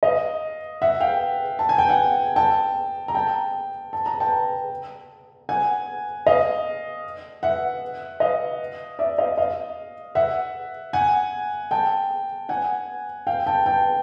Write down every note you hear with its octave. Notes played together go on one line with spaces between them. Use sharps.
D#5 F5
E5 F#5
F5 G5
A5
G#5
G5
F#5 G#5
G5 A5
A#5
G5 A5
A5
A#5
G5 A5
F#5 G#5
D#5 F5
E5 F#5
D#5 F5
D5 E5
D#5 F5
D#5 F5
E5 F#5
F#5 G#5
G5 A5
F#5 G#5
F5 G5
G5 A5
G5 A5